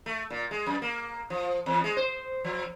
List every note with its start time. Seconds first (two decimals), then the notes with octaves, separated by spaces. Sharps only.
0.06 A3
0.30 A#2
0.51 G#3
0.66 F#2
0.82 A#3
1.30 F3
1.66 E2
1.84 G#3
1.97 C5
2.44 F3